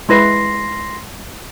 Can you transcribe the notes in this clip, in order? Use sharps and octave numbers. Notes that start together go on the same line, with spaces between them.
G#3 E4 B4 C6 A#6 C7